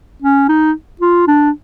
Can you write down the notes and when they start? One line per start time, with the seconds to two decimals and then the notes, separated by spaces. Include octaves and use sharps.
0.22 C#4
0.48 D#4
1.01 F4
1.27 D4